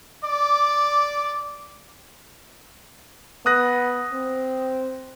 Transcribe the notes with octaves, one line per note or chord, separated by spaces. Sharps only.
D5 D6
B3 D#6 F#6 A#6
C4